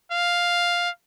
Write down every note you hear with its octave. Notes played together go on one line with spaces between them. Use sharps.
F5